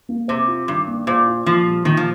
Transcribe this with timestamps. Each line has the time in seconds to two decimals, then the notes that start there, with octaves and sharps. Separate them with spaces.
0.09 A#3
0.28 C3 C5
0.47 F4
0.68 G2 D#3
0.87 A#3
1.07 A#2 C5
1.26 F4
1.46 A#2 F3
1.66 G3
1.85 A#2 D#3
1.97 F3